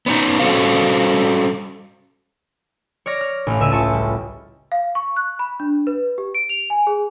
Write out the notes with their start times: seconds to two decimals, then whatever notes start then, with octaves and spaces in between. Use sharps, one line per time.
0.06 B3 C#4 D#4
0.40 G3 C#4 F#4 A4 C5 F5
3.06 C#5 D5 F6 A#6
3.21 F6
3.47 A1 F5
3.60 C#2 E5 E6 D#7
3.71 F4 E5 A5 C#6
3.93 G3
4.72 F5
4.95 C#6
5.16 F#6
5.39 B5
5.60 D4
5.87 B4
6.18 G4
6.35 D7
6.49 F7
6.70 G#5
6.87 G#4